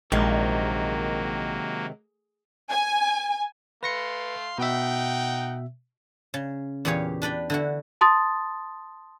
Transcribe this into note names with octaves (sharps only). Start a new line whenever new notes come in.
A#1 C3 D#3 F#3 G#3 A#3
G#5
A3 B4 F5 C6 A#6 C#7
B2 D#4 E5 F#5 G5
C#3
E2 A#2 G4 G#4 C#5 F5
D4 B4 D5 G5
D3 E4 F#4
A5 C6 D#6 A6